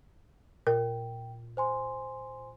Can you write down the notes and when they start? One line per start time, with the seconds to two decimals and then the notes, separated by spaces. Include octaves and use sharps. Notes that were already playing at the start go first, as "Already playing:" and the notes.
0.67 A#2 A#4 G5
1.57 C5 G#5 C6